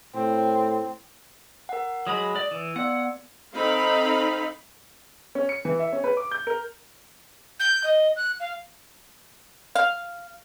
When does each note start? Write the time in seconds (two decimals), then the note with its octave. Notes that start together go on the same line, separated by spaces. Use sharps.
0.15 A2 C4
1.69 A#4 F#5
2.07 F#3 G#3 B5 D#6
2.36 D5
2.51 E3
2.76 B3 D5 F#5
3.53 C4 D#4 A4 F5 B5
5.35 C#4
5.49 C#7
5.65 E3
5.79 E5
5.93 C#4
6.04 B4
6.17 D6
6.31 G6
6.47 A#4
7.60 G6
7.84 D#5
8.16 F#6
8.40 F5
9.75 F5